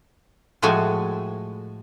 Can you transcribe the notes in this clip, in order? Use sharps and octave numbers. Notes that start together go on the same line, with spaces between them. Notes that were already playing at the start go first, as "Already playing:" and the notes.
A2 F3 G#3 A3 F#4 G#5